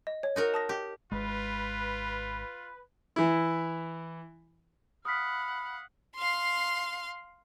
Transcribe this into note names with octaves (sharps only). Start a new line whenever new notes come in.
D#5
C#5
D#4 F#4 A#4
A5 D#6 A#6
G4
G#1 G#3 F4 B4
E3 E4
F5 F#5 B5 D#6 F6 B6
F5 C6